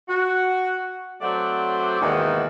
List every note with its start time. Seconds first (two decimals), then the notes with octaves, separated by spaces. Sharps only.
0.08 F#4
1.21 F#3 A3 C4 D5 F#5
2.01 D#2 G#2 B2 D#3 E3